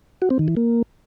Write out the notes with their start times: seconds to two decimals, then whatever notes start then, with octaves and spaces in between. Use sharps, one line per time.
0.22 F#4
0.30 C4
0.39 D#3
0.48 E3
0.57 A#3